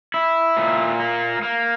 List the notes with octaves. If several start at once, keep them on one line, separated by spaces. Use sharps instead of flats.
E4
A#2
A#3
A#3